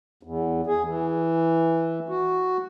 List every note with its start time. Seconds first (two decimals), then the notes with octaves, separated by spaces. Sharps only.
0.23 E2
0.67 G#4
0.86 E3
2.09 F#4